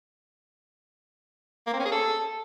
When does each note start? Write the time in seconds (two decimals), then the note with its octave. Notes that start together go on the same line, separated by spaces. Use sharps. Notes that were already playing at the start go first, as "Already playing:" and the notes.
1.67 A#3
1.73 C4
1.79 C#4
1.86 G#4
1.92 A4